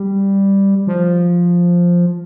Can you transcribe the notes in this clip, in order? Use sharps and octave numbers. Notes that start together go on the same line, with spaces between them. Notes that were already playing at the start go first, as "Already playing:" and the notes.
Already playing: G3
F3